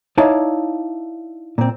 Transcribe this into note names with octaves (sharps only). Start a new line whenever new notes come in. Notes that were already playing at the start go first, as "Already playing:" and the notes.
D#4 E4 C#5 D5 F5 A5
A#2 C4